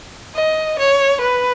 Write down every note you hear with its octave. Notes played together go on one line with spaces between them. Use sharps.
D#5
C#5
B4